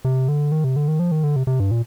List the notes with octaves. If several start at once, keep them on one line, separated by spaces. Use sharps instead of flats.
C3
D3
D#3
C3
D3
D#3
F3
D#3
D3
C3
C3
G2
A#2